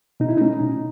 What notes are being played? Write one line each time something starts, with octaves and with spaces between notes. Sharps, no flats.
B2 D#4
E4
A3 C#4 D#4
B2